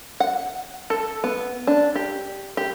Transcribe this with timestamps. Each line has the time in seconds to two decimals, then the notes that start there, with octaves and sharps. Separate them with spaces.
0.20 F#5
0.90 A4
1.24 B3
1.67 D4
1.95 G4
2.57 G4